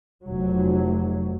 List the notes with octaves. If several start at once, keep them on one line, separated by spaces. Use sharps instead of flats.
F1 F#3